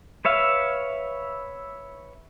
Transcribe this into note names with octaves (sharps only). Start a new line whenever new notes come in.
B4 C#5 E5 F5